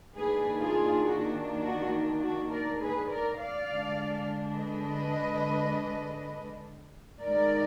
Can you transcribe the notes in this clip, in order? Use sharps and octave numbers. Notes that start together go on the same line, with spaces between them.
D#3 A#3 D4 G#4 B4
F4 G#4
F#4
F#4
F#4
A#4 D5
G#4 B4
A#4 D5
D5 F5
D3 G#3 D4
B4 D#5
D#3 G#3 D#4 A#4 D5